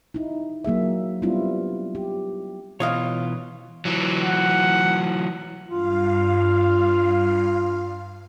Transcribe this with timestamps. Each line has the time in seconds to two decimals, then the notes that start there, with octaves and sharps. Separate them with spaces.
0.14 D#4 E4
0.64 F#3 A#3 G#4 E5
1.22 G3 B3 C4 D4 E4 F4
1.95 G4
2.80 B2 E3 F4 C#5 D#5 F5
3.85 E3 F#3
4.22 F#5
5.69 G2 F4 F5